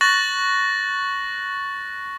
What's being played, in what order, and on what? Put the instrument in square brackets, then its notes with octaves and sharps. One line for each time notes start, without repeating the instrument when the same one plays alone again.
[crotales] C#6 F#6 A6 A#6 F#7